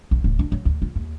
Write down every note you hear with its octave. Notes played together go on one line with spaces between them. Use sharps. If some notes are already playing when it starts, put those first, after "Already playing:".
A#1
D1
D4
F#3
D2
F4
D#2